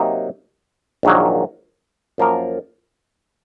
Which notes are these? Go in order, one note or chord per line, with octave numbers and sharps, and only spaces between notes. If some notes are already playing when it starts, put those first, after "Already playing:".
Already playing: C3 F#3 A#3 D#4
A#1 G#2 D#3 F#3 A#3
F#2 F3 A#3 F4 A#4